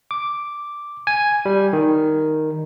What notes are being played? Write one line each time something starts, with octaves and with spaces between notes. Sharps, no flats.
D6
G#5
G3
D#3